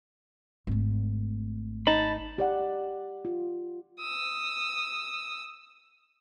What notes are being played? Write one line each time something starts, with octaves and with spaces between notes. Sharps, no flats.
G#1 A3
D#4 A5 B5
G4 D5 F#5
F4
D#6 E6